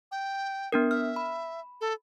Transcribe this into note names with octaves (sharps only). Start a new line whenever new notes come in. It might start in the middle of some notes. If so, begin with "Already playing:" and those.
G5
B3 D4 A#4
E5 F6
B5
A4